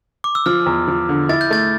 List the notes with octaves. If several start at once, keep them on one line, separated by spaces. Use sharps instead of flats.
D6
E6
F3 F6
E2
F3
D3
E4 A6
G6
A3 A6